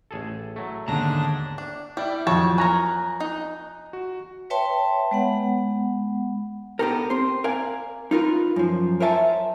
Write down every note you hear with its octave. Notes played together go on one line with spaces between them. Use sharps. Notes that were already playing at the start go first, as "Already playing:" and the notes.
A1 G#4 A4
F#3 A3
D#2 G#2 D3 B3 D4 A5 A#5 A#6
D4
G3 E4 D5 E5
F2 E3 F#3 C#5 A5
A#4 C#5 G#5 A#5 F#6
D#4
F#4
B4 C#5 E5 G5 A5 C6
G#3 B3 F#5
B3 D4 G4 A4 A#4
C4 C5
A#4 D5 F5 G#5
D#4 F4 A#4 B4
F#2 F3
A#4 C5 C#5 E5 G#5 A5